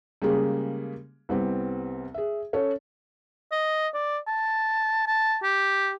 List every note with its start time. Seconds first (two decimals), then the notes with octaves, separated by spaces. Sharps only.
0.22 C#3 G3 G#3 A#3 G#4
1.29 C2 G3 B3 C4
2.14 G#4 E5
2.53 C#4 A4 C#5
3.52 D#5
3.94 D5
4.28 A5
5.07 A5
5.43 G4